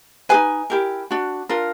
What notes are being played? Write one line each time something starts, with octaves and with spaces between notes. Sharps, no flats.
D#4 G#4 B4 G#5
E4 G4 A#4
D4 F#4
D4 F4 A#4